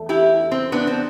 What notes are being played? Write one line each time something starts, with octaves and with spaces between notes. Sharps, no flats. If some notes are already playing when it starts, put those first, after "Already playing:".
Already playing: E2 A3
E4 G4
C4
B3 D4
C4